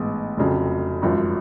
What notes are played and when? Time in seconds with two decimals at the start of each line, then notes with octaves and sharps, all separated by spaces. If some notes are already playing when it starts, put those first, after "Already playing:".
Already playing: A1 G#2 G#3 B3
0.37 F1 F2 C#3 F#3
1.02 G#1 F#2 F3